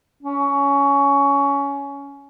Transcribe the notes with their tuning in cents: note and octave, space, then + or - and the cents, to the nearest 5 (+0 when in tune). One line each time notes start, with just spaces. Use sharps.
C#4 +20